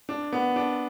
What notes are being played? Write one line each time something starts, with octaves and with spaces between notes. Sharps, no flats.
D4
B3
D4